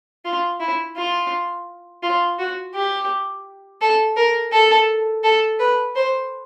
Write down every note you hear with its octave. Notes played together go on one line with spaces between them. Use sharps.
F4
E4
F4
F4
F#4
G4
A4
A#4
A4
A4
B4
C5